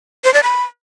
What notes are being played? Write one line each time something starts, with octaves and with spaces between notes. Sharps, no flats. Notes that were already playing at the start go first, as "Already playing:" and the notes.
C5
D5
B5